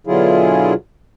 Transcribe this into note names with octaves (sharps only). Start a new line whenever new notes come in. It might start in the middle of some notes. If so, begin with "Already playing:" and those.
B2 D3 F#3 E4 F4 G#4